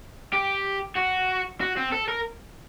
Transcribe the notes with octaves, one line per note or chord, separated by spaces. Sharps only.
G4
F#4
F#4
C4
A4
A#4